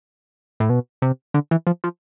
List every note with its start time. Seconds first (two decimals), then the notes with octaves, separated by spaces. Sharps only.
0.60 A2
0.70 B2
1.02 C3
1.34 D3
1.51 E3
1.67 F3
1.84 F3